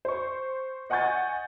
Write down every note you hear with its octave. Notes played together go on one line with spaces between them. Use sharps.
C5 C#6
D#5 F#5 G#5 C#6 G6 A6